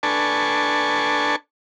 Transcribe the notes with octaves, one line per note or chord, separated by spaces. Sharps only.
D4 A4 B4 G#5 A5 C#6